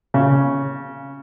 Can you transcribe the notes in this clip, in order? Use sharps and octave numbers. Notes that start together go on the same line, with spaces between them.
C#3